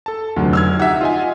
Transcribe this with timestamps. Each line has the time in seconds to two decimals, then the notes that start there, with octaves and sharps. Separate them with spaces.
0.06 A4 A5
0.36 F1 D2 F#3 F4
0.53 E6 F6 G#6
0.79 D#4 G4 E5 F#5
1.01 F4 D#5 G#5